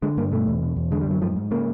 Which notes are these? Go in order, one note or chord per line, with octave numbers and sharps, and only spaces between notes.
D3 G#3
G2 A#3
B2 A3
E2
B2
E2
D3 G#3
G3
F#2 F#3
G#2 F3
G#2
C#3 A#3